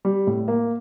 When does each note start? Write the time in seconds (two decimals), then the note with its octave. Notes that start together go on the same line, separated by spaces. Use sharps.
0.05 G3
0.27 A2
0.48 A#3